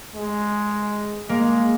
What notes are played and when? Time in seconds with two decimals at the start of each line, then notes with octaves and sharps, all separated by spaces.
0.15 G#3
1.29 G#3 A#3